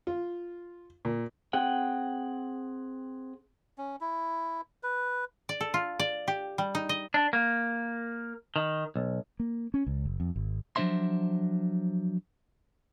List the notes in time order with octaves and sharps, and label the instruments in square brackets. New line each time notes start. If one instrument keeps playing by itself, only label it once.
[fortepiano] F4
A#2
[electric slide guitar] C4 G#4 F#5 G5
[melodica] C#4
E4
B4
[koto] D5
A4
F4
D5
G4
G3
D#4
D#5
[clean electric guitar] D4
A#3
D#3
B1
[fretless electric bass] A#3
C#4
C#2
F#1
F2
G#1
[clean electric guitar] F3 F#3 D4 C5 E5 C6